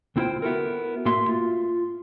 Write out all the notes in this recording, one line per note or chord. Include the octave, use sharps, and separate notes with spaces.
D2 C4 E4 F4 C5 G5
B3 E4 F#4 A4 A#4
A2 A#3 F#4 E5 C6
F4